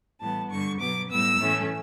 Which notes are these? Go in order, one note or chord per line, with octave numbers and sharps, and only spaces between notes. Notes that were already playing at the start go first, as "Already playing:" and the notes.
A2 E3 G3 B3 A5
G2 D3 G3 C#6
B2 F#3 B3 D6
A2 G3 B3 E6
A2 E3 A3 C#4